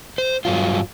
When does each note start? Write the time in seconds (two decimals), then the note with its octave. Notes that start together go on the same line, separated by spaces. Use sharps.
0.18 C5
0.45 G2 F#3 F4